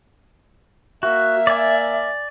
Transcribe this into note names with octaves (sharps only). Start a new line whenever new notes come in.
A#3 F#4 A#4 E5
D5 G#5